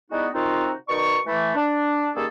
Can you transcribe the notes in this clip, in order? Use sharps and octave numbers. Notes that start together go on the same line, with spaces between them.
G3 G#3 B3 D#4 E4 F#4
C3 D#3 C4 D#4 F4 F#4
B2 D#3 D#4 D5 C#6
E3 A3
D4
D#3 G3 A#3 C#4 G#4 A4